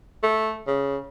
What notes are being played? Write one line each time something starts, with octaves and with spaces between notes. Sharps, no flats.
A3
C#3